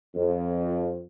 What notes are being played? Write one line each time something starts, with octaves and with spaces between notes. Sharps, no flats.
F2